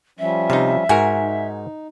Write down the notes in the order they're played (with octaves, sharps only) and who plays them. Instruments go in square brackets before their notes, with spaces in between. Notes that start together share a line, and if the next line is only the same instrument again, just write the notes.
[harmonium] F3 G3 C#4 [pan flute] E5
[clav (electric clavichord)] C3 D#4 [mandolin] F5
[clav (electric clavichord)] G#2 F#4 A#4 [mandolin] G#5
[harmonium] D#4